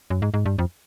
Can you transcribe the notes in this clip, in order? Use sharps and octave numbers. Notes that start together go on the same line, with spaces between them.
F#2
G#2
G#2
G2
F2